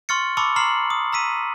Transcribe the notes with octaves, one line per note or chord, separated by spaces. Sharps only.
C6 C#6 F6 A6 C#7
A5 B5 C#6 D6 E6 C#7
A#5 C6 F6 C7 F#7
D#6
A#5 E6 B6 D#7